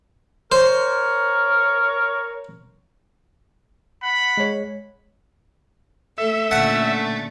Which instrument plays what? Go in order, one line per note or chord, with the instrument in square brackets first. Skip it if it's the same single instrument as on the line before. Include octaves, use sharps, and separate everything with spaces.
[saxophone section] A#4 C#5 [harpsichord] C5
[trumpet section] F#5 B5
[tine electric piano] G#3 C#5
[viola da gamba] A3 A4 [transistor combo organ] E5
[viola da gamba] A#2 D3 C#4 [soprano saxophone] A3 [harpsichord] F#5